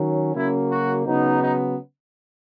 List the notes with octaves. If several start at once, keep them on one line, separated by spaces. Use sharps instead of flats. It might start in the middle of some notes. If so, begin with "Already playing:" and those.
Already playing: D#3 F#3 C#4
C#3 F#3 A#3 C#4 E4
F#4
C#3 F#3 B3 D#4
D#4